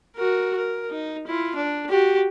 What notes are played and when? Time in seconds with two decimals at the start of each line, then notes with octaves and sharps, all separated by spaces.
0.16 F#4 A#4
0.57 A#4
0.90 D#4
1.27 E4 F4
1.56 D4
1.89 F#4 G4